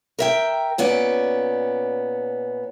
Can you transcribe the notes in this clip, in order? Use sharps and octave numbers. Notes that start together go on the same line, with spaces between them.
A#4 E5 G5
A#2 B3 C#4 D5